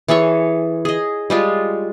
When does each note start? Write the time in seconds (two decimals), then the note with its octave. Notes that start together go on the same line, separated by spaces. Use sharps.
0.08 E3 G#4 A4 C#5
0.85 G#4 D#5
1.30 G3 G#3 F4